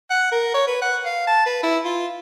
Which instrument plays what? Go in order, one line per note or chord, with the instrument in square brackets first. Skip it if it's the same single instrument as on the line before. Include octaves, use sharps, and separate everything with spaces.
[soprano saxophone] F#5
A#4
C#5
B4
F#5
F5
A5
B4
E4
F4